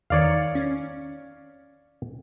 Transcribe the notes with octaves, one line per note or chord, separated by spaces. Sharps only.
E2 D#3 C#5 D5 F5 C#7
C#4